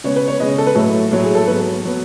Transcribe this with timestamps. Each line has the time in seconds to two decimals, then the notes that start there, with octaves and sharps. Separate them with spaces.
0.04 C#3 G#3 B3 C#5
0.16 B4
0.28 C#5
0.39 C#3 G#3 B3 D#5
0.58 A4
0.67 B4
0.75 A2 F#3 A3 A4
1.12 A2 F#3 A3
1.23 G#4
1.35 A4
1.47 G#2 F#3 B3 B4
1.85 F#3 B3